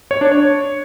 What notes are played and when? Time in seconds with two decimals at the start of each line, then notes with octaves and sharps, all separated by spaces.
0.11 C#5
0.21 D4
0.32 C#5